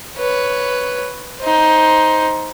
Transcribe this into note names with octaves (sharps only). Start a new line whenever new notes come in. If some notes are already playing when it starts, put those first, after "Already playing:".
B4 C#5
D#4 C5